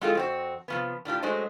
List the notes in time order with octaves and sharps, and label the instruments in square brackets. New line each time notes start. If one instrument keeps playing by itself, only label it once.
[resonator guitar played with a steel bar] G#3 C4 E4 F4 G#4 A4
F2 C4 F#4
C3 F3 B3
A2 D4 F4 G4
F#3 G#3 A3 C5 D#5